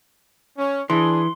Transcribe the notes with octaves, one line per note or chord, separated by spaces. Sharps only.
C#4
E3 D4 G#4 C6